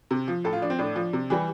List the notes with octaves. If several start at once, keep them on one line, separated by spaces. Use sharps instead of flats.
C3
F3
A2 A4
F4
F3 D4
C4
A2 D4
F3
C3
E3 G3